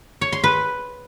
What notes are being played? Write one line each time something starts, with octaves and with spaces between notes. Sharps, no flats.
C#5
C6
B4